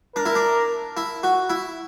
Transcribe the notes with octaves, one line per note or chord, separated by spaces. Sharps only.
D4 A#4
E4
D4
E4
F#4
E4